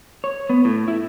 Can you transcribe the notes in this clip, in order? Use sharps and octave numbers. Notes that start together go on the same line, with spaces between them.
C#5
B3
A2
E4